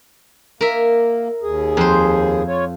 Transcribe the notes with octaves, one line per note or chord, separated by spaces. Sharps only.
A#3 A#4 E5
D#2 G#4
F2 C5
F4 C#5